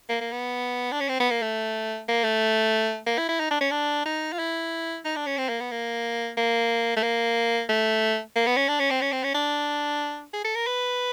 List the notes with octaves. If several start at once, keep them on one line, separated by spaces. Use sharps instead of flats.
A#3
A#3
B3
D4
C#4
C4
B3
A#3
A3
A#3
A3
A#3
E4
E4
D#4
D4
C#4
D4
D#4
F4
E4
D#4
D4
C#4
C4
A#3
B3
A#3
A#3
A3
A#3
A3
A#3
B3
C#4
D4
C#4
C4
C#4
C4
C#4
D4
G#4
A4
A#4
B4